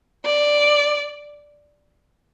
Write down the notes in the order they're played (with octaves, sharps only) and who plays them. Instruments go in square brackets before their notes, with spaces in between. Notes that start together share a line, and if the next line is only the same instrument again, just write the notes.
[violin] D5